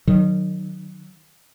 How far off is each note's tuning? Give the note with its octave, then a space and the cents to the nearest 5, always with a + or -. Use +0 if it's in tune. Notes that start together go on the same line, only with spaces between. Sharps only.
D#3 -25 F#3 +0